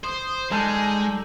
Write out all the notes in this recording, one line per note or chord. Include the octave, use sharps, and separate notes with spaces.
C5 D#6
G3 G#3 D#4 A4 G#5